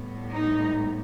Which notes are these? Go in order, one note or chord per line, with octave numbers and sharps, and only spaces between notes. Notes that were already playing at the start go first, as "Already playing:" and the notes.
Already playing: A2 G3 B3
D#4